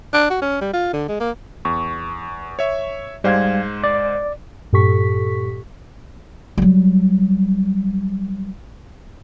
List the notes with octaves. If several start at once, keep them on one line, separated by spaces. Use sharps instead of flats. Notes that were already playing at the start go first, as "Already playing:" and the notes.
D4
F#4
C#4
G3
F4
D3
G#3
A#3
E2 C#6
C#5 E5
G#2 G3 G#3 C5 F5 G#6
D5
G2 A#2 G4 A4 C#6 B6
F#3 G3